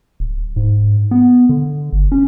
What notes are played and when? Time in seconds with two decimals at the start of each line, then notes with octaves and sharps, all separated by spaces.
0.20 D1
0.56 G#2
1.11 B3
1.49 D3
1.92 G1
2.12 C#4